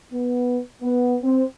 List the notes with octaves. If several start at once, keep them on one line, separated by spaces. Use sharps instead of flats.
B3
B3
C4